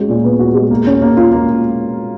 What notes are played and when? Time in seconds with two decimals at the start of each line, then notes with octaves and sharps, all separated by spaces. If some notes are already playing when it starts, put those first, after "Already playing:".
Already playing: G#3 C#4 F#4
0.09 A#2
0.24 B3
0.39 F#4
0.55 G#3
0.71 A#3
0.86 C#4
1.02 A#3
1.17 F4
1.32 A#3